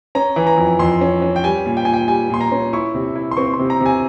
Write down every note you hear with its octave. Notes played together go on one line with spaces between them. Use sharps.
C#4 A#5
E3
A#5
F2
F2 C6
C#4
C#4
G5
G3 G#5
A#2
G5
A#2 G#5
G5
G3 G#5
A#2 C6
A#5
C#4
E4 C#6
C3
E4
C6
C4 C#6
C6
C3
A#5
C3
G#5